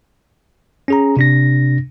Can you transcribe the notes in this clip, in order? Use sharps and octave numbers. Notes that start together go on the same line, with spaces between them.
C#4 G#4 A#5
C3 D4 A#6